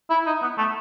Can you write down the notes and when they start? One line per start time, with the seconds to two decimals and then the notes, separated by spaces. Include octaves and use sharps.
0.10 E4
0.26 D#4
0.42 B3
0.58 A3